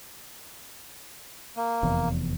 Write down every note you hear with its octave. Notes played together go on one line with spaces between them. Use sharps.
A#3
F1 E2